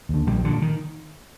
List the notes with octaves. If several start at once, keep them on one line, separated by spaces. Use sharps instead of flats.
D#2 D3
A#1 G3
A#2 D3
D#3